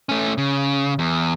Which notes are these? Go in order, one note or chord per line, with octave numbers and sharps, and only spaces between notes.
A3 C#4
C#3
E2